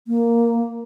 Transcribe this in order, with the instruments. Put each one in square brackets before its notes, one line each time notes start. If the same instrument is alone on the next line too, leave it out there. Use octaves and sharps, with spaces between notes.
[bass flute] A#3